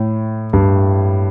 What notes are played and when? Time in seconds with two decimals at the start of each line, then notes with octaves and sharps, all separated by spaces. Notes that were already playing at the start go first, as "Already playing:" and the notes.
Already playing: A2
0.53 G2